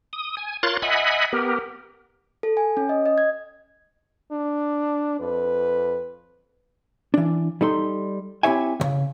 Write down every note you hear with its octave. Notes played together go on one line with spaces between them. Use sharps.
D#6
G#5
F4 A#4 C#5 C6 F#6 A6
D#5 E5 F#5 G#5 B5
B3 G4 A#4
A4
G#5
C#4
D#5
D#5
G#6
D4
F2 B4
E3 D4
G3 D#4 A4 C6
C4 E4 G4 C#5 E5 G#5
D2 C#3